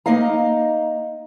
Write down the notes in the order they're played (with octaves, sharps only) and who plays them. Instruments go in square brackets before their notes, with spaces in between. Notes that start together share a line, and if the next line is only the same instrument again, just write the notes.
[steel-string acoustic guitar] A#3 D#4 D#5 F5 A#5